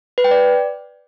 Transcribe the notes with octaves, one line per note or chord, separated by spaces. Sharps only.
B4
G5
D5